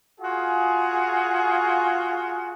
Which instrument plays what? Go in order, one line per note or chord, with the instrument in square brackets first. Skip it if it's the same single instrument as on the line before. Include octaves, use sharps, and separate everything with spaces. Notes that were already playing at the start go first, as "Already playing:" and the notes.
[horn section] F4 F#4 G#4